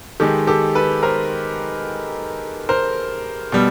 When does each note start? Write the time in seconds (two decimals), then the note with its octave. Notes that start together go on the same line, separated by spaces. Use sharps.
0.20 D#3 G#3 G4 A4
0.47 G4 A4
0.75 A4 B4
1.03 A#4 C5
2.69 A#4 C5
3.52 B2 G3